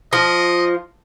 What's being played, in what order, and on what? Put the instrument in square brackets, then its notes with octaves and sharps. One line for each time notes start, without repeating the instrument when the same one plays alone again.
[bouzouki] F3 [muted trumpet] D#5